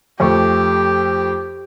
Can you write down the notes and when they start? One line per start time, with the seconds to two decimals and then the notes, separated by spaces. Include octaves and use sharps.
0.20 F2 A3 G4 C#6